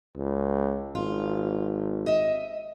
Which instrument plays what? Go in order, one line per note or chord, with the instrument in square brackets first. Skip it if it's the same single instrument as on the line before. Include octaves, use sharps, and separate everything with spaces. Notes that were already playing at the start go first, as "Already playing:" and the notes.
[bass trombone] C#2
[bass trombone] G#1 [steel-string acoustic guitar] F4
[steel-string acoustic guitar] D#5 E5